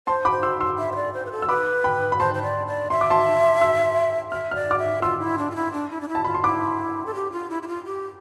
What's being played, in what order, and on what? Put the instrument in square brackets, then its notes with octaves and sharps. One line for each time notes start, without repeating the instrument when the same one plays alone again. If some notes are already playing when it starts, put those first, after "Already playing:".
[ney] C5 [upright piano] A5 C6
[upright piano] B5 D6
[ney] C5
[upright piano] C6 E6
C6 E6
[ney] E5
C5
D5
C5
B4
A4
[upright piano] E6
[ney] B4 [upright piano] B5 D6
[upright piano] G5 B5
B5
[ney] C5 [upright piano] A5 C6
[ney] C5
D5
D5
[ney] E5 [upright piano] C6
[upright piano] D6
A5 C6
C6 E6
[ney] E5 [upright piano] F6
[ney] D5 [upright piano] F6
[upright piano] D6 F6
[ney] E5
[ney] F4 [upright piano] C6 E6
[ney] E4
D4
F4
E4
D4
E4
D4
E4
[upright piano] A5
[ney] F4 [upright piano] B5
[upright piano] C6
[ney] E4 [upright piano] B5 D6
[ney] A4
G4
F4
E4
E4
F4
G4